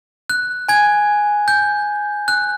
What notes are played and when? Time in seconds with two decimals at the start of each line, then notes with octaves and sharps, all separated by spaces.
0.30 F#6
0.69 G#5 G#6
1.48 G6
2.28 F#6